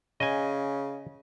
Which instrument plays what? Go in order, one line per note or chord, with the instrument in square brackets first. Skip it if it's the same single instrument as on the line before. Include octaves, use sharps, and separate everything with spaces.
[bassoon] C#3 [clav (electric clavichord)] D#5 G#5